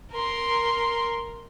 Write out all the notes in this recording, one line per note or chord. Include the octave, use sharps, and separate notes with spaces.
A#4 C6